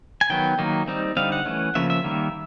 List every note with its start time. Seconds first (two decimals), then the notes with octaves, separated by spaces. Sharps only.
0.21 G#5
0.30 D#3 F#3 B3 G5
0.59 D#3 F#3 A#3 D#4
0.88 G3 C4 D#4
1.17 D3 G3 C4 D#4 F5
1.32 F#5
1.46 E3 A3 C#4
1.75 C#3 F3 A#3 C#4 E5
1.90 E5
2.04 D#3 G3 A#3